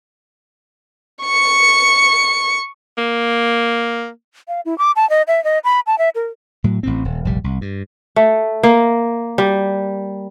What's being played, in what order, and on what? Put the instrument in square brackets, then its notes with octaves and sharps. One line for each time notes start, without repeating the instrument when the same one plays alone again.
[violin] C#6 C#7
[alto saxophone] A#3
[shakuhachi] F5
E4
D6
A5
D#5
E5
D#5
B5
A5
E5
A#4
[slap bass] A2 F#3
A1 A2 C4
D#1
F1 A#1 G3
C2
G2
[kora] A3
A#3
G3